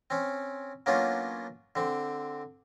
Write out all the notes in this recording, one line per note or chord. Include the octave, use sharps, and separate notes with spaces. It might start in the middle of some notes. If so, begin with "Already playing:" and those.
C4 C#4
F#3 A#3 B3 C#4 D4 F4
D3 C4